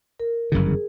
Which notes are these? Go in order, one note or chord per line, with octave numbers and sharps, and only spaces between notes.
A#4
G1 F#2 C#3 E3
G#4